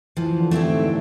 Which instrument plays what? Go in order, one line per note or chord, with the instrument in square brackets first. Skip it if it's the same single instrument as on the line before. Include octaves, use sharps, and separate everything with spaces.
[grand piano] E3 [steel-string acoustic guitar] F3
[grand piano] D3
[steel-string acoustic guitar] A3 C4 E4 G4
[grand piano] G#2
A#2